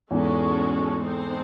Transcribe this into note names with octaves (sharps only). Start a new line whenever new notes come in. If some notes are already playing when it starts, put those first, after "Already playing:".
E2 G#2 G#3 C#4 F#4 A4
G#3 C4 D#4 A4 C5